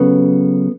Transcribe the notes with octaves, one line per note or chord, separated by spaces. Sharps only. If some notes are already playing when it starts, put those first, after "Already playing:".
Already playing: C#3 F#3 B3 A4